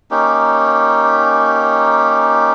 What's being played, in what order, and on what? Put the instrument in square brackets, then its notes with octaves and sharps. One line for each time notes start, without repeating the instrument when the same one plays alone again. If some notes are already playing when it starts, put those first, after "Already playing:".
[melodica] A#3 C#4 D#4 G4